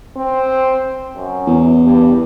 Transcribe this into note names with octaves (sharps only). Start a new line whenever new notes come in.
C4
F#2
E2
G2